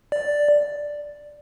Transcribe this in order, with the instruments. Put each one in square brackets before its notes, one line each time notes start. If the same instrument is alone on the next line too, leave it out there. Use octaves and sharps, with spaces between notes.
[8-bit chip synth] D5